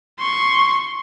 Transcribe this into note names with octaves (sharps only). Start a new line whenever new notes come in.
C6 C#6